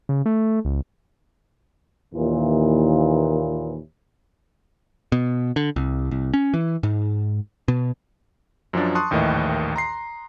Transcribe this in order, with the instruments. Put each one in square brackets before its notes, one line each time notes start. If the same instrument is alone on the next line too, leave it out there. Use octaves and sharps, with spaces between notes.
[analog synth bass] C#3
A3
C#2
[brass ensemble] D#2 A#2 E3
[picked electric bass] B2
D3
C2
C2
C#4
E3
G#2
B2
[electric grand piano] F#2 F3 F#3 D4
A5 C6 C#6 D#6 F#6
A#1 D#2 A2 D#3 E3 D#5
A#5 C6 C7